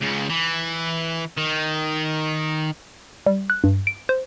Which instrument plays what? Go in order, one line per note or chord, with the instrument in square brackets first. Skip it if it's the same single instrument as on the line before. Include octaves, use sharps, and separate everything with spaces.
[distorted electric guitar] C#2 C#3
E3
D#3
[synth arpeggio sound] G3
F#6
G2
D7
C5